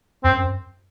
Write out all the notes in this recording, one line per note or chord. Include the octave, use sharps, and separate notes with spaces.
F#2 C4